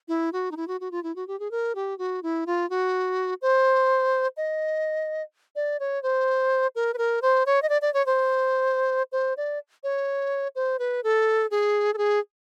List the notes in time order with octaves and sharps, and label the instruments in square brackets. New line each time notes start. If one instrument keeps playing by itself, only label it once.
[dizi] E4
F#4
D#4
E4
F#4
F#4
F4
E4
F#4
G4
G#4
A#4
G4
F#4
E4
F4
F#4
C5
D#5
D5
C#5
C5
A#4
B4
A#4
C5
C#5
D#5
D5
D5
C#5
C5
C5
D5
C#5
C5
B4
A4
G#4
A4
G#4